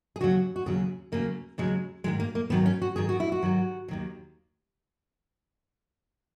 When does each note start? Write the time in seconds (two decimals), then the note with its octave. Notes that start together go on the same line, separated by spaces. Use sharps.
0.16 G#4
0.20 D#2 C#3 F#3 F#4
0.56 F#4
0.66 D#2 C#3 F#3 G#4
1.12 D#2 C#3 F#3 A#3
1.58 D#2 C#3 F#3 G#3
2.04 G#2 D#3 F#3 G#3
2.20 A#3
2.35 A#3
2.50 G#2 D#3 F#3 B3
2.66 C#4
2.82 F#4
2.96 G#2 D#3 F#3 G#4
3.09 F#4
3.20 E4
3.32 F#4
3.43 G#2 D#3 F#3
3.88 D#2 D#3 F#3